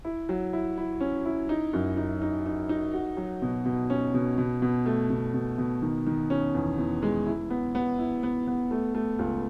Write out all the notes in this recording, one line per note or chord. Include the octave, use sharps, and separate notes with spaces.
E4
F#3
E4
E4
C#4
E4
D#4
F#2
D#4
D#4
D#4
D#4
F#4
F#3
B2
B2
C#4
B2
B2
B2
A3
B2
B2
B2
D#3
D#3
C#4
E2
E2
G#3
E4
B3
B3
E4
B3
B3
A3
A3
C#2